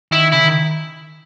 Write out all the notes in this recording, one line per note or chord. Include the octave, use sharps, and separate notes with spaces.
D#3 E4
C#3 E4
D#3